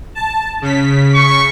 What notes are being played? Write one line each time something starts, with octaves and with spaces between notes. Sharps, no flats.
A5
C#3 B6
C#6